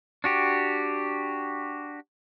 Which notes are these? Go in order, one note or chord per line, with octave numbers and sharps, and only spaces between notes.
D4 F#4 G4